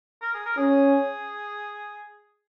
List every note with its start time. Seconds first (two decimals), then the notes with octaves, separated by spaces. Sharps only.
0.22 A#4
0.34 G#4
0.46 A#4
0.58 C#4 G#4